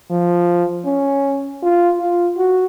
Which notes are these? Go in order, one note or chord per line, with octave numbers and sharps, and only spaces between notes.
F3
C#4
F4
F4
F#4